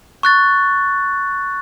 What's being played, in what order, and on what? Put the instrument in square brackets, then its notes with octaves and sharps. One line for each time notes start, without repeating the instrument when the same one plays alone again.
[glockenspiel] C#6 F#6 A6